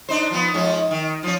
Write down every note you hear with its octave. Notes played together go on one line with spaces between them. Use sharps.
D4 D#4 C5
F3 B3
G#2 F3 C#4
D#3
F3 C#4